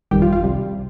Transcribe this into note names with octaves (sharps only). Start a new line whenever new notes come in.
G1 F2 D#3 G3 G4
F4
F4
C2 C3 G3